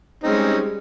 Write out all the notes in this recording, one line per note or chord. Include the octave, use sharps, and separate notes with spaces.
G3 G#3 C4 C#4 D#4